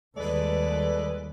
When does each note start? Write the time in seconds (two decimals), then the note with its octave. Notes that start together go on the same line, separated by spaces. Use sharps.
0.16 D#2 G3 G#3 A4 B4 D5